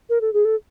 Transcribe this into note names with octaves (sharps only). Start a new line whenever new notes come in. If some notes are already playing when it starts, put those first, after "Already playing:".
A#4
A4
G#4
A4